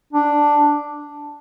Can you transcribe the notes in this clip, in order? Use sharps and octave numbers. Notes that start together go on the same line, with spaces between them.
D4